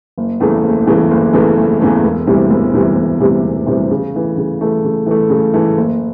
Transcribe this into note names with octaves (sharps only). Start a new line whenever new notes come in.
F#1
E2 C#3 E3 A3
F#1
E2 C#3 E3 A3
F#1
E2 C#3 E3 A3
F#1
E2 C#3 E3 A3
E1
D2 C3 E3 G3
E1
D2 C3 E3 G3
E1
D2 C3 E3 G3
E1
D2 C3 E3 G3
C#3
E3 A3
C#3
E3 A3
C#3
E3 A3
C#3
E3 A3
F#1